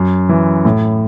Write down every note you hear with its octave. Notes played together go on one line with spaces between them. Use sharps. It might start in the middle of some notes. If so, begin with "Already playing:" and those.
Already playing: F#2
E3
A2